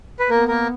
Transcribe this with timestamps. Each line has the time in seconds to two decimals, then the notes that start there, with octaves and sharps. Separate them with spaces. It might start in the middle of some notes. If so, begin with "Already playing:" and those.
0.20 B4
0.30 A#3 B3 A#4
0.48 A#3 A#4